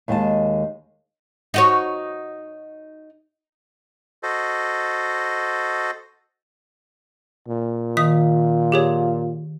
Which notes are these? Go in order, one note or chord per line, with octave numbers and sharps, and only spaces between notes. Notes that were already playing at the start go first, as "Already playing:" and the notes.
D#2 D#3 G#3 G#5 A5
D#4 F#4 C#5
F#4 A4 C5 D#5
A#2
D#3 F4 D#6 B6
G4 G#4 C#5